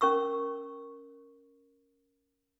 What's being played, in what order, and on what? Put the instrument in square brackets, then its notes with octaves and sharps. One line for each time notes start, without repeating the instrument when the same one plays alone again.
[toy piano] C#4 A#4 C#6 E6